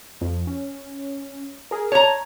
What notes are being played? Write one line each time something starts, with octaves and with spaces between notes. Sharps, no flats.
F2
C#4
G#4 A#4
C#5 A5 A#5